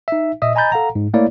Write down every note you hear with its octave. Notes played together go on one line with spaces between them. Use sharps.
D#4 E5
A#2 D#5 E5 D#6
D#5 G#5 A#5 B5 G6 A6
A4 F5 F#5 A#5
G#2
A3 A#3 E4 C#5 D5